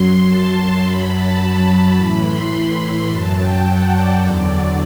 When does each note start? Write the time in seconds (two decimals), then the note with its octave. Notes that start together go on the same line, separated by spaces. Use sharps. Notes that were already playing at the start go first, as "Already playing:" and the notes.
Already playing: F#2 F#3 C6
0.26 A5
0.55 C6
0.82 F#2 F#3 B5
1.11 A5
1.67 A5
1.95 A2 E3 B5
2.24 C6
2.80 B5
3.09 F#2 F#3 A5
3.37 G5
3.66 F#5
3.94 D5
4.21 E2 D3 F#3 D5